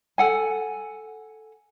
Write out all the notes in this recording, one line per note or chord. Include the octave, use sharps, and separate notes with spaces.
A4 F#5 G#5